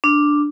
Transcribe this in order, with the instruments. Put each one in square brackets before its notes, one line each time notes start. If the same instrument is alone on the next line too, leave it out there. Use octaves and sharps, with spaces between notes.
[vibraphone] D4